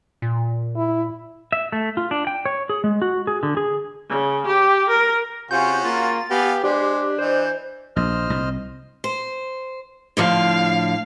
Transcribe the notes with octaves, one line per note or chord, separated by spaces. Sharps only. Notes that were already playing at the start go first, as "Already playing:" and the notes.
A#2
E4
E5
A3
F4
D4
G5
C#5
G#4
G#3
F#4
G#4
D3
G#4
C#3
G4
A#4
C3 C#4 F4 F#4 G#4 G6
A#3 F4 A6
B3 G4 F5 G#5
G#3 D4 G4 C5
E3 C5 D#5
A#1 C5 D#5 F6
C2
C5
A2 D3 F3 F5